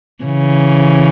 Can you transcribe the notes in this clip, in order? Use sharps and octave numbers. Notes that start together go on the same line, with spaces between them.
C#3 E3